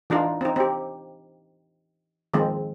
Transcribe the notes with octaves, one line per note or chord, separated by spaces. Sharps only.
E3 D4 D#4 F4
C4 D#4
C4 G4
D#3 F3 G#3 C4